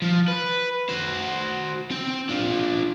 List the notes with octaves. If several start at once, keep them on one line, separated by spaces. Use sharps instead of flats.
F3 F4
B4
F#4 C5
C4 G5
D4 F4